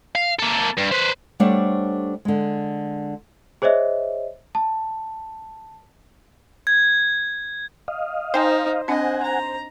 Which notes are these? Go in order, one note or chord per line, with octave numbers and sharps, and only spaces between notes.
F5
A#3 A4
G2
B4 C5
G3 A3 D4 C5 C#5 F#5
D3 G#3
G#4 C5 C#5 D#5 E5
A5
G#6
D#5 F5
D#4 C5 G5 G#5 C6
C4 D4 D#5 F#5 G#5
A#5